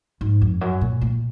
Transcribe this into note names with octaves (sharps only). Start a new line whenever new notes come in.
G#2
F2
F#2
A#2
A#2